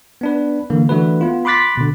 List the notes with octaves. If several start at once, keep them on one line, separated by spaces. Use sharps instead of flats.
B3 D4 B4
D3 E3 A#3
E3 A3 D4 F#4 B4
B3 F4
B5 C6 D6 F#6 A6 B6
B2 D3